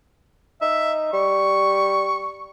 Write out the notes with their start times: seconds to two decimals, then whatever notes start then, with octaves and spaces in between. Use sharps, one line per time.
0.61 D#4 E5
1.13 G3 C#6